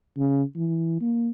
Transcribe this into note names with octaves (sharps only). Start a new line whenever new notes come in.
C#3
E3
A#3